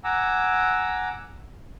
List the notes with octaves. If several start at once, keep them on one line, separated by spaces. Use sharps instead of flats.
F#5 G#5 A#5 D6 E6